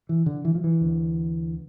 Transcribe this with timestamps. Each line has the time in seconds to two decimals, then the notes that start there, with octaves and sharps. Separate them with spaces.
0.09 E3
0.26 D3
0.45 E3
0.55 F3
0.64 E3
0.81 D2 D3